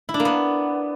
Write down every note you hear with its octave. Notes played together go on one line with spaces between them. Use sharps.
E4
D4
A#3
B3